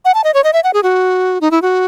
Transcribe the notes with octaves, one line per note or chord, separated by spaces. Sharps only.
F#5
A5
D#5
C#5
D#5
E5
F#5
G#4
F#4
D#4
E4
F#4